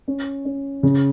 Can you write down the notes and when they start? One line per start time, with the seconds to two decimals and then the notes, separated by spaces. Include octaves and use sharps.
0.08 C#4
0.45 C#4
0.83 C#3